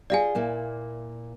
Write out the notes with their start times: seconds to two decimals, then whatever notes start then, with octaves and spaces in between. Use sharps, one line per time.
0.10 F4 G4 G#4 D5 F5 G#5
0.35 A#2 A#3 E4